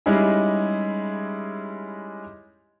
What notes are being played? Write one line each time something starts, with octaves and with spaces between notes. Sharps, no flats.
G3 G#3 C#4 D#4 E4 G#4